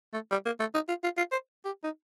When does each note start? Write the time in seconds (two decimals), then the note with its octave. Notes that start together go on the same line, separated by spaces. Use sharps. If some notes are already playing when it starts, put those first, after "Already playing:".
0.13 A3
0.31 G3
0.46 A#3
0.60 A3
0.74 D#4
0.88 F4
1.04 F4
1.17 F4
1.32 C5
1.65 G4
1.84 D#4